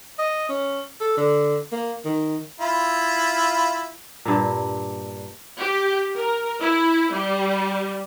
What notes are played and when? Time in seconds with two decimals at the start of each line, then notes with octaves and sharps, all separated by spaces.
0.19 D#5
0.49 C#4
1.00 A4
1.17 D3
1.72 A#3
2.05 D#3
2.60 E4 F4
4.25 G2 A#2
5.59 G4
6.15 A#4
6.60 E4
7.13 G3